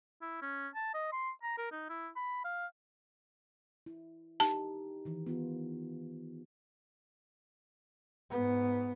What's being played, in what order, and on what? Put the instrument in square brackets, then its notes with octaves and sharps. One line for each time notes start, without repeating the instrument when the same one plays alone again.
[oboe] E4
C#4
A5
D#5
C6
A#5
A#4
D#4
E4
B5
F5
[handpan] E4
[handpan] D#4 G4 [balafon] A5
[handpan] D#3 E3
B3 F4
[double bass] G#2 B3